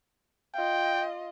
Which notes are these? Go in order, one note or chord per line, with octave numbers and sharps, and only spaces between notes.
F4 D#5 G5